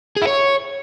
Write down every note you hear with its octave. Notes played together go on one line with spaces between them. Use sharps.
G#4
E4
C#5